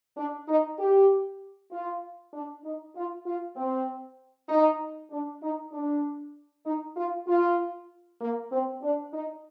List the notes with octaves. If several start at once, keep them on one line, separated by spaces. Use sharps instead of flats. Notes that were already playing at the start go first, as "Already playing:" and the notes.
D4
D#4
G4
F4
D4
D#4
F4
F4
C4
D#4
D4
D#4
D4
D#4
F4
F4
A#3
C4
D4
D#4